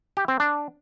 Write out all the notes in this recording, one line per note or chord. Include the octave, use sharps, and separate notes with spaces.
G4
C4
D4